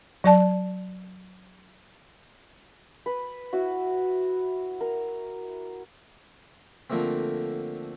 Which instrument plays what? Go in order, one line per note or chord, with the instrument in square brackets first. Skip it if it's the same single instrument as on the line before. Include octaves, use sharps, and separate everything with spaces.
[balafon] F#3 D5 A5
[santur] B4
E4 F#4
A#4
[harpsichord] D3 F3 A3 A#3 C4